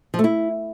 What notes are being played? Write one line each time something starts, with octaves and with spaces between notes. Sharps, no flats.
F3
A3
E4